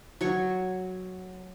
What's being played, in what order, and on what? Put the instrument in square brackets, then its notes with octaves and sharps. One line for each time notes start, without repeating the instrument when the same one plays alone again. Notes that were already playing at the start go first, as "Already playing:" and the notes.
[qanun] F#3 C#5 C#6